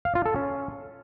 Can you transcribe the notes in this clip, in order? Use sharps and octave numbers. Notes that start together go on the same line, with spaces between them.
F5
F4
A4
C#4